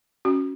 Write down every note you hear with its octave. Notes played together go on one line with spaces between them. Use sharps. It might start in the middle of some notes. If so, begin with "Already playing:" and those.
C#4 F#4